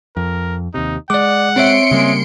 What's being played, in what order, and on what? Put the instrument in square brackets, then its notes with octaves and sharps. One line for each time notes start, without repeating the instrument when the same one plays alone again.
[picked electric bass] F2 [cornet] A#4
[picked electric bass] D#2 C3 [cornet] D#4
[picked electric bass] G#3 [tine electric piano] D5 D6 [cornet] F#5
[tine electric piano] C4 C#5 E5 [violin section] C6 C#7 D7
[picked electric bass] C#3 G3 A#3 [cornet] G#3